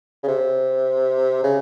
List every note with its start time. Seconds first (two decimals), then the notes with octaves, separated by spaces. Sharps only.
0.23 C#3
0.28 C3
1.44 C#3